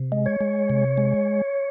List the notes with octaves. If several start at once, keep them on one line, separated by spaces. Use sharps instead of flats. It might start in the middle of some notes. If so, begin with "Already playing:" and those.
Already playing: C3
G#3
C#5
G#3
C3
G#3